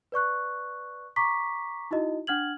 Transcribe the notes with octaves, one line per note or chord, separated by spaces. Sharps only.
B4 D5 C#6 F#6
A#5 C#6 D6 B6
D#4 E4 F#4 D#5
D4 F#5 F6 G#6 F#7